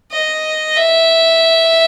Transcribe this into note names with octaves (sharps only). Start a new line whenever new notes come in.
D#5
E5